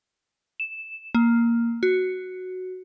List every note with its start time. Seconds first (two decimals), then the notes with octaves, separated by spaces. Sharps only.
0.60 E7
1.15 A#3
1.83 F#4